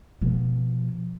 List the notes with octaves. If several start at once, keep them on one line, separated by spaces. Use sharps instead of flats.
B2 F3